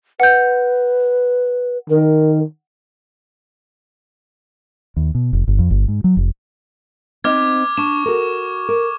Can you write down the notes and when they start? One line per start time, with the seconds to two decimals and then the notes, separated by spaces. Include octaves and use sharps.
0.20 B4 F#5 G6
1.90 D#3 A#4
4.97 D#2
5.15 B2
5.33 F1
5.48 G1
5.59 F2
5.71 G1
5.88 G#2
6.04 F#3
6.17 F1
7.24 C4 D#4 D#5 D6 F6 G#6
7.77 D4 C#6 E7
8.06 F#4 A4 A#4
8.69 A#4